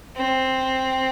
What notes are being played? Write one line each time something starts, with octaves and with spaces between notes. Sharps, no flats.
C4